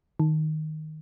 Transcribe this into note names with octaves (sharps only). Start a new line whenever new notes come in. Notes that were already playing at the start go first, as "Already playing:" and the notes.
D#3